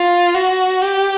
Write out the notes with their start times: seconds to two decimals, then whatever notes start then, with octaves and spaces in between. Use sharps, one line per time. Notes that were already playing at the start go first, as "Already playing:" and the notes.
Already playing: F4
0.34 F#4
0.81 G4